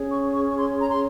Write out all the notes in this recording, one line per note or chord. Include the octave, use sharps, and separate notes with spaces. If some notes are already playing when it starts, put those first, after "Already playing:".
Already playing: C#4 G#4 C#5
C#6
C#6
C#6
C6
A#5
C6